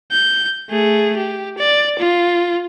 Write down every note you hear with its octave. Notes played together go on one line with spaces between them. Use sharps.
G6
A3 G#4
G4
D5
F4